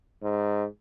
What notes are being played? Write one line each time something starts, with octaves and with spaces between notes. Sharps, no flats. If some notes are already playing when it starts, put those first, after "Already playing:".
G#2